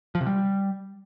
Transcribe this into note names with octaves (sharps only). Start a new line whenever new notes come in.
F3
C3
G3